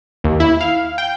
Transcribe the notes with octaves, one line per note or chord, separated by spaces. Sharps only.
D#2
E4
F5
G5